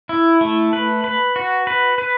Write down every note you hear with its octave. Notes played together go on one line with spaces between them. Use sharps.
E4
A3
B4
B4
F#4
B4
B4